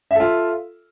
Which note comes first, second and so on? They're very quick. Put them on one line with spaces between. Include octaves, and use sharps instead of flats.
E5 A4 F4